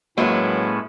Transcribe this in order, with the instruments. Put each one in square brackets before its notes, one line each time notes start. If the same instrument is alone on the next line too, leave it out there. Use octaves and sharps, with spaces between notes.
[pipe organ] A2 C#4 [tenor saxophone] F#3 [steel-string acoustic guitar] G#3 E4 B4 [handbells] A#3